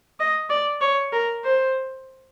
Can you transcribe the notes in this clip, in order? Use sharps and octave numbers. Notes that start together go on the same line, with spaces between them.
D#5
D5
C#5
A#4
C5